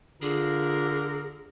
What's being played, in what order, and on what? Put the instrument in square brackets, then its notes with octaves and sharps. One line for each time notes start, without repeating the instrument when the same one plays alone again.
[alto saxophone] D3 [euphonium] F4 [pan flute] G#4 [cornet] A#4